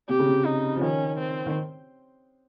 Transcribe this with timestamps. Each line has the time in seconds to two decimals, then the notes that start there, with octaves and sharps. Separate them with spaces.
0.09 C3 G4
0.19 C#3
0.28 C3
0.45 D#4
0.76 F3
0.81 D#3 C#4
1.19 C4
1.46 D#3